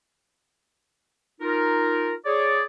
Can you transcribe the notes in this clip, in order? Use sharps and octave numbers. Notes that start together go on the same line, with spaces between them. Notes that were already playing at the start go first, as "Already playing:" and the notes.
D#4 F4 A#4
G#4 C#5 D5